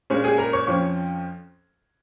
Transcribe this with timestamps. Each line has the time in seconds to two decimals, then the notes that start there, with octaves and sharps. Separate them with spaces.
0.10 A#2 G#3 C#4 C#5
0.24 G#4 G#5
0.38 A#4 A#5
0.53 C#5 C#6
0.67 F2 F3 C#4 C#5 C#6